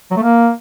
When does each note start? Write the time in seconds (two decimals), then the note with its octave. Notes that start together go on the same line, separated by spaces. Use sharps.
0.11 F#3
0.17 A3
0.22 A#3